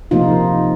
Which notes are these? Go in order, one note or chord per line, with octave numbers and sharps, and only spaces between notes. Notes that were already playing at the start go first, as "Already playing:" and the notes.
C3 F3 A#3 D#4 F4